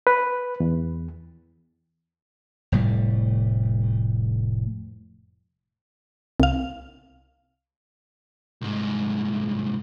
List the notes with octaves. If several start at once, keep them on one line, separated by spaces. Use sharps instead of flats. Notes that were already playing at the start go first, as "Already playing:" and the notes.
B4
E2
F1 A2 G3
C2 F5
C2 G#2